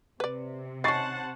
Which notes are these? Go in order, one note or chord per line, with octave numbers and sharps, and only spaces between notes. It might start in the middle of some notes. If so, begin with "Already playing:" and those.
C3 B4 D5
D#3 C#4 C5 F#5 A5 C#6 A6 C7